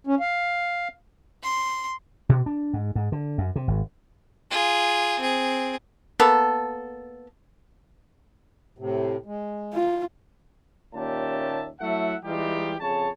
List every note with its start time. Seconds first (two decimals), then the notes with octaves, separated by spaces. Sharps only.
0.07 C#4
0.20 F5
1.43 C6
2.29 B2
2.46 D4
2.73 G#2
2.95 G#2
3.12 D3
3.38 F#2
3.56 C3
3.68 G#1
4.51 F4 G#4
5.20 C4 G#4
6.20 A#3 B3 A4
8.78 A2 C3
9.26 G#3
9.73 F4
10.95 D#2 A#2 C#4 G4 E5 A5
11.80 F#3 A3 E4 A4 E5 F#5
12.25 E3 G3 G#3 D#4 F4 G4
12.81 F2 C#3 G#4 C#5 A5